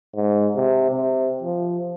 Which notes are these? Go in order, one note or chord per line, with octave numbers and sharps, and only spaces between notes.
G#2
C3
C3
F3